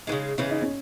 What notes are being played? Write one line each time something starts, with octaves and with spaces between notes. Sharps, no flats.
C#3 E3 G#3 D#4
C#3 E3 G#3 C#4
D#4
C#4